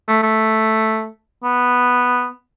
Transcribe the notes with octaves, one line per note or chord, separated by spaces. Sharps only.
A3
A3
B3